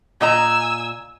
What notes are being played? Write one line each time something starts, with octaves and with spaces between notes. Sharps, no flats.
A#2 D#5 G#5 A#5 E6